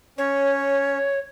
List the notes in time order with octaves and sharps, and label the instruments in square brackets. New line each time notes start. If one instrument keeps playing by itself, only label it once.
[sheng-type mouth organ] C#4 [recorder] C#5